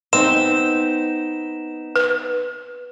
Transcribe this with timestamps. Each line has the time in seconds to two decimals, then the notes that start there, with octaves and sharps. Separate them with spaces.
0.13 B3 C4 D#4 E7
1.96 B4